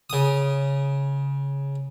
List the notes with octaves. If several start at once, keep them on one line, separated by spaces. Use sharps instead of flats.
C#3 D#6